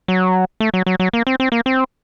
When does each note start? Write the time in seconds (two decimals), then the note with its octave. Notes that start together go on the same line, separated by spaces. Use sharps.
0.08 F#3
0.60 A3
0.74 F#3
0.86 F#3
1.00 F#3
1.13 A#3
1.27 C4
1.40 C4
1.52 A#3
1.66 C4